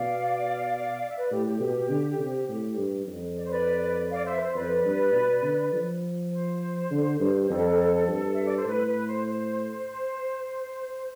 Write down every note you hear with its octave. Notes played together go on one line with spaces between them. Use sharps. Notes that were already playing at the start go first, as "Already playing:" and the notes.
Already playing: B2 D5 F5
E5
B4 D5
A2 G4
G4
B2
D3
C3
A2
G2
F2
D5
C5
B4 D5
D5 F5
C5 E5
B4
C5
F2 B4 D5
G2
B2
D3
F3
C5
D3
G2
F2 A4
G2
E5
D5
C5
A2 B4
B4
C5
C5